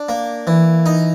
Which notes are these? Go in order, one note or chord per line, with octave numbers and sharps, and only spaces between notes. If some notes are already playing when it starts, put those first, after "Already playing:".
Already playing: D4
A#3
E3
D#4